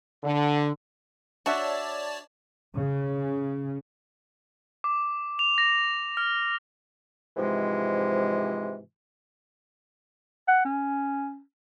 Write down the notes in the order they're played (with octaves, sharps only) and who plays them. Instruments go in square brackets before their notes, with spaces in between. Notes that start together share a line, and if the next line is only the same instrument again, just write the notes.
[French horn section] D3
[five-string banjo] D4 [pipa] F#4 E5 [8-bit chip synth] C#5 D5 A5
[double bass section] C#3
[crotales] D6
F7
A#6
F6
[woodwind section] G#2 C3 E3 F3 G#3
[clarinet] F#5
C#4